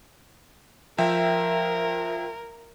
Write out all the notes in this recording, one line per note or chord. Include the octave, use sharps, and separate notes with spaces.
F3 A#4 E5 G5